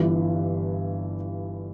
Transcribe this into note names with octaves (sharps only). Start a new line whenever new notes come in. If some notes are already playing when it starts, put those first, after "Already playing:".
Already playing: G1 G2 E3